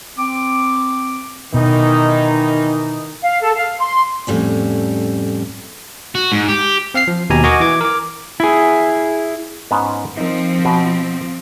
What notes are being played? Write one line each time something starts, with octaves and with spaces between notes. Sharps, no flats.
C4 D6
B2 D#3 E3 D#4
F5
A4
F5
C6
F2 A2 G3 C#4
F#4
G#2
G4
C4 F5 F6 C7
F3
D#2 B2 G4 G#5 A#5
F#4 A#4 D#5 G#5 C#6 D6
E3 D6 G#6
A#4 D6
E4 G#4
G#2 B3 C#4
F3 C4 D#4 A#4
B2 F#4 G#5